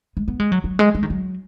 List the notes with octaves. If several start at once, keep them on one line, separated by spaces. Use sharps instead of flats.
G#3
B3
G#3
F#3
F#3
G#3
G#3
D#3
F#3